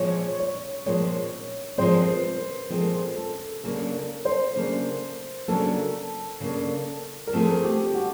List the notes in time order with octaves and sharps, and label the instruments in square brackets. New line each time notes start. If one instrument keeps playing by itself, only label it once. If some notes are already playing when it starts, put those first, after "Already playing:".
Already playing: [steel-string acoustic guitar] A#2 F3 G#3 C4 [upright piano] C#5
[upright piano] C#5
[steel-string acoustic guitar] A#2 F3 G#3 C4 [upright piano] C#5
[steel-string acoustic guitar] A#2 F3 G#3 C4 [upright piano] C5
[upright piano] B4
A#4
[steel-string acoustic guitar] A#2 F3 G#3 C4 [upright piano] A4
[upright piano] A4
[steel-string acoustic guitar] C#3 F#3 A#3 D4 [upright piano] A4
[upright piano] A#4
C5
[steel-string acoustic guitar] C#3 F#3 A#3 D4
[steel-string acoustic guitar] C#3 F#3 A#3 D4 [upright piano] A4
[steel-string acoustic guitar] C#3 F#3 A#3 D4
[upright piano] A#4
[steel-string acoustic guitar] F3 A3 C4 F4 G#4 [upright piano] A4
[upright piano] G4
F#4